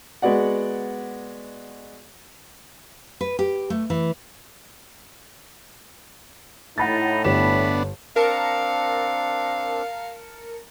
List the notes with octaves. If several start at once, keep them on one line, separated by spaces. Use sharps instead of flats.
G#3 B3 F#4 D5 F#5
B4
G4
A3
E3
A2 D#4 F#5 B5 A6
G1 B3 D4 C#5 B5 E7
C4 D4 A#4 F5 A5 C#7